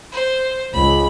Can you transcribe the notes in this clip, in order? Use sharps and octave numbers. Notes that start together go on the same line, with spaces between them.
C5
C#2 B5